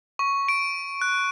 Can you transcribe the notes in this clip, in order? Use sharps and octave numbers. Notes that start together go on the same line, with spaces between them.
C#6
D7
F#6